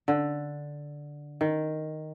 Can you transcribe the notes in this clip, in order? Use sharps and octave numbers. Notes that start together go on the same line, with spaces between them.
D3
D#3